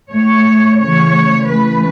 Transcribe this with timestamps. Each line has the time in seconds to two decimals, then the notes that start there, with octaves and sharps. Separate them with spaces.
0.10 A2 A3 C#5
0.79 C#3 E3 A3 C#5
1.47 C#3 E3 A3 B4